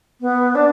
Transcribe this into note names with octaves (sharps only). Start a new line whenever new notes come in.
B3
D4